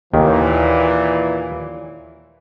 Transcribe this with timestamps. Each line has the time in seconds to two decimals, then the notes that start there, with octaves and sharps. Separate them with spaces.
0.14 D#2 A#2 D#3 E3